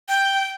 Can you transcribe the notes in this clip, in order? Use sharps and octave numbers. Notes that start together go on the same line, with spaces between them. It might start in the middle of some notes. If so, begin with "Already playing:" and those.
G5